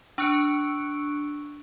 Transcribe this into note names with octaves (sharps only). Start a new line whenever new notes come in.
D4 C#6 E6 F#6 C#7 D7